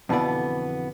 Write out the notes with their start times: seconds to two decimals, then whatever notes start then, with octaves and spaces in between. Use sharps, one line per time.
0.09 F2 B2 D3 E3 B3 D5